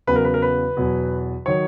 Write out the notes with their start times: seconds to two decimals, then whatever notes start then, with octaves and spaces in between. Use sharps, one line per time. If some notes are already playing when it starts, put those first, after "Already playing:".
0.07 E2 C#3 F#3 B4
0.16 A#4
0.25 B4
0.34 A#4
0.42 B4
0.77 E2 B2 F#3
1.46 D#3 F#3 C#5